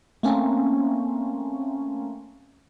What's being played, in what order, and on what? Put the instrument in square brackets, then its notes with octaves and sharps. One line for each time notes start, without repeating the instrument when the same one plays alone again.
[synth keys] A3 A#3 C4 C#4